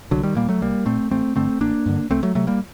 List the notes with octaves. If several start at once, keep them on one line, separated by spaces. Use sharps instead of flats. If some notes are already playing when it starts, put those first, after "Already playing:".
C2 D3 F#3
D#3 G3
A#2 G3 A#3
F#3 A3
C2 G3 A#3
A#2 A3 C4
A1 A3 C4
G2 D3 A3 C4
A1 A#3 D4
G2 D3
C2 A3 C4
F#3 A3
C3 F#3 A3
G3 A#3